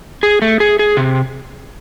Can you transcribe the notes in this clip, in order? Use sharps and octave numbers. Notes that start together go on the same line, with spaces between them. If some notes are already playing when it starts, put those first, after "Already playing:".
G#4
A3
G#4
G#4
C3